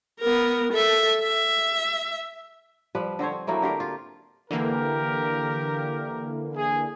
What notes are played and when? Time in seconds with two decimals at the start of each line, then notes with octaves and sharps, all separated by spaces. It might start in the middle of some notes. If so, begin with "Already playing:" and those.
0.20 B3 A#4
0.72 A4 E5
1.22 E5
2.95 F3 G3 B4
3.19 D3 C4 C5 C#5
3.32 C4
3.47 E3 F#3 A3 A#3
3.62 D3 G4 A#4
3.80 F4
4.51 D3 E3 A#3 G4 A#4
6.56 G#4